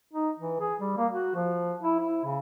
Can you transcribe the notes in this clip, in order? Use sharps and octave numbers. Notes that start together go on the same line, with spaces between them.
D#4
E3
G#4
G3
A#3
F#4
F3
E4
E4
C#3